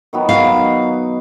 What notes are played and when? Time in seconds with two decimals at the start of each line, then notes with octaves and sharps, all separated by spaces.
0.13 D#3 F#3 B3
0.29 F#3 F5
0.44 D#4